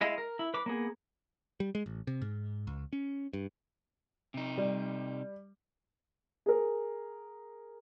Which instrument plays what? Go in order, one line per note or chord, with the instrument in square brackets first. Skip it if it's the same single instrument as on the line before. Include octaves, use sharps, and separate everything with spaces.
[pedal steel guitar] G#3 E4 D#5 F5
A#4
E4
B4 D6
A#3 B3 G#4
[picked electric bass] G3
G#3
A1
C3
G#2
C#2
C#4
G2
[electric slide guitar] C3 D#4
[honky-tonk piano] G3
[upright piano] G#4 A#4